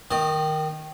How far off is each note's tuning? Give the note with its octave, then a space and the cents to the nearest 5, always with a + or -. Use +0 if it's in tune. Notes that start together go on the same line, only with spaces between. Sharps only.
D#3 +0 D#5 -40